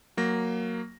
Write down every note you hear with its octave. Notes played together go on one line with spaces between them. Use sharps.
F#3 A#3 A#6